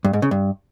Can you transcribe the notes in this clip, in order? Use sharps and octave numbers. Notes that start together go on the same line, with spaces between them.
G2
G#2
C#3
G2